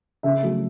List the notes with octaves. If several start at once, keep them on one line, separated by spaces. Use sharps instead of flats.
C#3 E5
F#3 A3